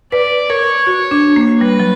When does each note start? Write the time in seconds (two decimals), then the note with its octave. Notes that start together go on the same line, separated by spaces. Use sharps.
0.12 B4 D5
0.49 A#4 C#5
0.87 F#4
1.11 D4
1.36 A#3
1.61 G3 B4
1.80 F#3